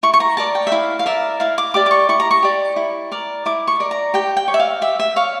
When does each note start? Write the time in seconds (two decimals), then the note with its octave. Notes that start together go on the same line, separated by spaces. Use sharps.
0.03 E4 C#6
0.14 C#6
0.20 A#5
0.37 A#4 D5 A5
0.55 G5
0.67 E5
0.72 E4 F5
0.99 F5
1.06 A#4 D5 E5
1.40 E4 F5
1.58 D6
1.74 G4 D5 D6
1.86 D6
1.91 C#6
2.09 E4 C#6
2.20 A#5
2.31 C#6
2.43 G4 D5
2.76 E4
3.12 A#4 D5
3.46 E4 D6
3.67 C#6
3.80 A#4 D5
3.91 A#5
4.14 G4 G5
4.37 G5
4.48 C#5
4.54 E5
4.60 F5
4.81 G4 E5
5.00 E5
5.16 C#5 F5